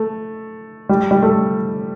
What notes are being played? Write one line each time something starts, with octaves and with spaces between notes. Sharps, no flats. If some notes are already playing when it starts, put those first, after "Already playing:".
Already playing: A3
G3
G3
A3